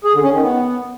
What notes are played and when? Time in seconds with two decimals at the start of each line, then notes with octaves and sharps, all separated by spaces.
0.04 G#4
0.14 D3
0.23 C#4
0.33 D#3
0.42 B3